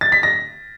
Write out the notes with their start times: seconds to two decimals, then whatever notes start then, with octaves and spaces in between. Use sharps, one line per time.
0.01 A6
0.12 B6
0.23 A#6